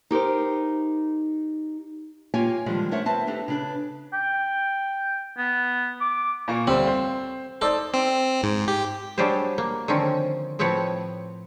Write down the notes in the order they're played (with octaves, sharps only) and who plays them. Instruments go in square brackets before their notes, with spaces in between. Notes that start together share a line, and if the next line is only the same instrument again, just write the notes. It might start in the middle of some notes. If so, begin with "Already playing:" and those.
[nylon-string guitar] D#4 G4 A#4 C5
A#3 F4 G4 C#5 G5 G#5
D3 D#3 F3 G3 G#3
A3 A#4 C5 C#5 E5 F#5
C4 B4 C5 E5 A5
D4 D#4 G4 A4
C#3 D4 B4
[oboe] G5
B3
D6
[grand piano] A#2 A#3 C#6
[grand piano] D2 G3 F#7 [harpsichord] C4
[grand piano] C5
[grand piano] D#4 C5 D5 [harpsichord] A4
[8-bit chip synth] C4
G#2
G4
[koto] F#3 G3 D4 G4 G#4 C5
A#3
D3 D#3 F3 C4 C#4
A2 F3 C4 B4 C#5 F#5